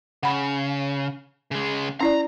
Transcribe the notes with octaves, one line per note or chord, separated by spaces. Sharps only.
C#3 F#5 B5
C#3 G#3
C#4 E4 D5 A#5